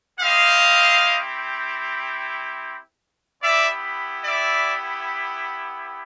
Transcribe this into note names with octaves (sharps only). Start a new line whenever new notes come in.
C4 E4 G4 D#5 F5
B3 E4 G4 D5 E5
D5 E5